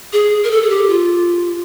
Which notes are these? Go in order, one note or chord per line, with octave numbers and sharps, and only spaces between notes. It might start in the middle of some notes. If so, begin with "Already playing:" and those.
G#4
A#4
A4
G#4
G4
F4